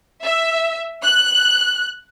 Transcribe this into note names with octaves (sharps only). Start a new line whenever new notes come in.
E5
F#6